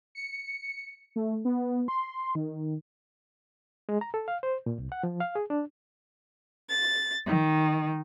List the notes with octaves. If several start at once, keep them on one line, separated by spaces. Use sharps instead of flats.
C#7
A3
B3
C6
D#3
G#3
A#5
A4
F5
C5
A#2
C2
F#5
F3
F5
G#4
D4
A6
D#3